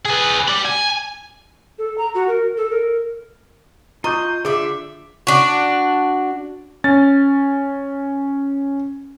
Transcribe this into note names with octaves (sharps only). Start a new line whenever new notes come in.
G#4 B4
G4 B5
G#5
A4
A#5
F#4
A#4
A4
A#4
F4 D#5 A#5 C#6 G6
D3 F4 G#4 D5 E5 D6
D4 F#4
C#4 A6